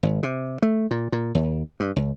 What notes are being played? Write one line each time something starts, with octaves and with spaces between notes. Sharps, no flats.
G#1
C3
A3
A#2
A#2
D#2
G2
C#2